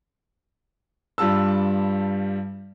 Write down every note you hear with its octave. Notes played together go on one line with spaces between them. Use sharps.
G2 G3 F4 A5 E6